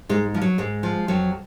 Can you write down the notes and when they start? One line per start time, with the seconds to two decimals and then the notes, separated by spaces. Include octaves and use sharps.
0.09 G#2 G#3
0.34 F3
0.42 F#3
0.58 G#2 G#3
0.83 F3
1.08 F2 F#3